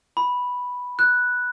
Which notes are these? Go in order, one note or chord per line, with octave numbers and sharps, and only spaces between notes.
B5
F#6